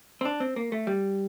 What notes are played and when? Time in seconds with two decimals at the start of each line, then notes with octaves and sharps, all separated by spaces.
0.21 C4
0.25 D4
0.40 C4
0.56 A#3
0.72 A3
0.87 G3